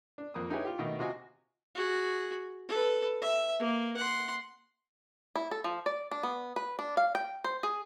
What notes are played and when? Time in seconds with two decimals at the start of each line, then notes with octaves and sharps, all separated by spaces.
0.18 D4
0.34 F2 A#3 D#6
0.50 D#4 E4 G4 G#4 B4 C#5
0.65 F4 G4
0.78 B2 D#3 A3 D#5
0.99 C3 F4 F#4 D#5 G#5
1.75 F#4 G#4
2.69 A4 B4
3.21 E5
3.59 A#3
3.97 F#5 C6
5.36 E4
5.51 A4
5.64 F3
5.86 D5
6.11 D4
6.23 B3
6.56 B4
6.79 D4
6.97 F5
7.15 G5
7.44 C5
7.63 G#4